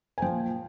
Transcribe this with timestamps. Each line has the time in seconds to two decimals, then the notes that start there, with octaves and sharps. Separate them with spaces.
0.18 G#5
0.22 A#2 F3 G5